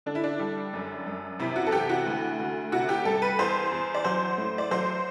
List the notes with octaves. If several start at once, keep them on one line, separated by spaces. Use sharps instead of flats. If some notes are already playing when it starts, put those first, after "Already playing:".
D3 D4
E4
D4
G3
F#2
F#2
C3 E4
F#4
A4
E3 G4
F#4
D2
D2
C3 F#4
G4
G3 A4
B4
E2 C5
E2
D5
F#3 C5
A2
D5
F#3 C5